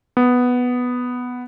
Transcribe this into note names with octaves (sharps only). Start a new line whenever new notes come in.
B3